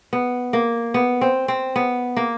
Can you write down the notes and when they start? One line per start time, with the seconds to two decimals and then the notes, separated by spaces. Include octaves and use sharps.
0.13 B3
0.53 A#3
0.94 B3
1.21 C4
1.48 C4
1.76 B3
2.17 A#3